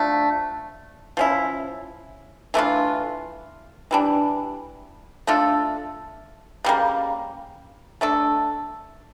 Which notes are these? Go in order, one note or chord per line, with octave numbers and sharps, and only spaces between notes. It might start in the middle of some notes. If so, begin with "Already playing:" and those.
Already playing: D3 F3 A3 D4
F3 C#4 E4
E3 A3 D4 F4
E3 G3 D4
A3 D4 F4 A4
C#3 G3 A#3
A3 D4 A4